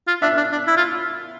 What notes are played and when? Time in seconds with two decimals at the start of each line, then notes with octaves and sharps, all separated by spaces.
0.08 F4
0.22 D4 E5
0.37 D4
0.52 D4
0.67 E4
0.77 F4